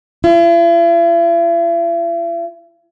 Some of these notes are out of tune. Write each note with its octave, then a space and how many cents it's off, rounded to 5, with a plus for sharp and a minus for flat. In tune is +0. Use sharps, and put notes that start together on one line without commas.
E4 +45